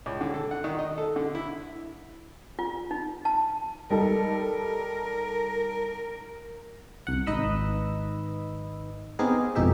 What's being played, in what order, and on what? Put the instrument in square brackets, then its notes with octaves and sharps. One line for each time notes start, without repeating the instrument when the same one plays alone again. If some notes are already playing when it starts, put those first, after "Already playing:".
[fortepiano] C#2
D3
A4
F#5
D#3
D#5
A4
D3
E4
[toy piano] F4
D#4
A5
[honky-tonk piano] G3 D#4 A4 [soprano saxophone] A#4
[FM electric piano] C2 F#5
G#1 D#4 B4 D#5 B5 E6
B3 C4 D#4 G4 G#4 A#4
G#1 F2 B2 D#4 G4 E5